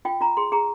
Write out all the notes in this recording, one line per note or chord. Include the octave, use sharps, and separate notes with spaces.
F4 G5
F4 A#5
G#4 C6
G#4 A#5